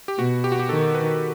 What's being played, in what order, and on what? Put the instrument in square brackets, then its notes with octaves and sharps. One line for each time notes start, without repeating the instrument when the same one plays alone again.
[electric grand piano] G4
[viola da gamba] B2 [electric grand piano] F#4
[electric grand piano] G4
F#4
G4
[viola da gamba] D#3 [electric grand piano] A4
[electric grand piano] B4